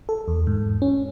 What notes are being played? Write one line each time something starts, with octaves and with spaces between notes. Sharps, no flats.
A4
E2
G#2
C#4